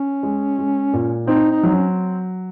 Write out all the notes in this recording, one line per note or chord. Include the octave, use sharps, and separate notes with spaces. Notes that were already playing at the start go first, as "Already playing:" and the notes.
Already playing: C#4
G#3
G#3
A#2
C4 D#4
D#4
F#3
C#4